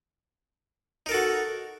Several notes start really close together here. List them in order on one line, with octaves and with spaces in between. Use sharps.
D#4 A#4 A4 F#4